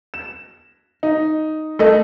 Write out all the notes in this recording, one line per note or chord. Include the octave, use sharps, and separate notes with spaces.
E7
D#4
A3 A4 D#5